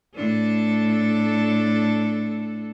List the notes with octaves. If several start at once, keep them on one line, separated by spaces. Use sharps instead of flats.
A2 D4 A4